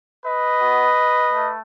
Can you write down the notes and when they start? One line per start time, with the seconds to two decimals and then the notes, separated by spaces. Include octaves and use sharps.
0.25 B4 D#5
0.61 B3 F#4
1.33 A3